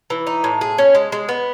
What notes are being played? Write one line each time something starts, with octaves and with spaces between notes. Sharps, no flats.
E3
D#4
A2
G#4
C#4
G#3
G#3
B3